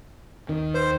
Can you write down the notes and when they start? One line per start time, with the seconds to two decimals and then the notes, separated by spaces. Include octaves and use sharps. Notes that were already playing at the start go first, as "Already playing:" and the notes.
0.49 D#2 D#3
0.74 B4 C5